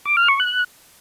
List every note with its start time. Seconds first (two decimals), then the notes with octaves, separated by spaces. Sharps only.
0.05 D6
0.17 F6
0.28 C#6
0.40 F#6